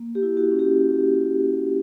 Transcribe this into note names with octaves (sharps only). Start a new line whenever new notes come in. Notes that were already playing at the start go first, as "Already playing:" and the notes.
Already playing: A#3
G4
E4
F#4
C#4
G4